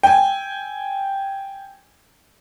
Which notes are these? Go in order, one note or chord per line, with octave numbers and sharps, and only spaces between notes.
G5 G#5